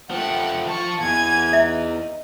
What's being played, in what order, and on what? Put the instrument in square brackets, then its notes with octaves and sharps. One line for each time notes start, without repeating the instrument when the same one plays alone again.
[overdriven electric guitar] F3 A3 [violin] F#5 G5
[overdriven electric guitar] F3 A5 [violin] F4 C#6
[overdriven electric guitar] E2 [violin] G#5 G#6
[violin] D#4 [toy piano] E5